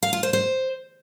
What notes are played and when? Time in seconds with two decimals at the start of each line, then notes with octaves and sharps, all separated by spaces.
0.03 F5
0.13 F4
0.23 C5
0.33 C5